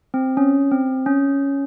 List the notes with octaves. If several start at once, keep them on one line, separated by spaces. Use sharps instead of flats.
C4
C#4
C4
C#4